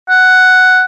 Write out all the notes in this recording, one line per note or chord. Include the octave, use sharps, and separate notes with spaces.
F#5